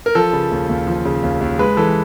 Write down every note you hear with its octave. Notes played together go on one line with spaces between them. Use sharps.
A#4
F3 A4
C#3
D#2
D#2
F3
C#3
D#2
D#2
G#3 B4
E3 A4